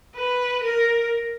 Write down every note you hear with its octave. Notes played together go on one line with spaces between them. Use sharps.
B4
A#4